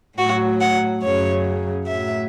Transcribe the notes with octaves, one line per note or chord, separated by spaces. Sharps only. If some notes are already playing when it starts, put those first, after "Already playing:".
A2 F#3 F#4
F#5
F#2 C#3 F#3 C#5
F#3 E5
A2